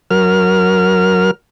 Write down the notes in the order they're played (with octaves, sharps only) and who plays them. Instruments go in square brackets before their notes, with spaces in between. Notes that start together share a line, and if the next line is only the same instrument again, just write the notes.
[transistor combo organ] F#3 A#4 F6